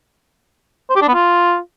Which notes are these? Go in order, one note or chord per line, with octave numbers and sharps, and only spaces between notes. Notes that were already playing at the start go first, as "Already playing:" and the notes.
C5
G4
D4
B3
F4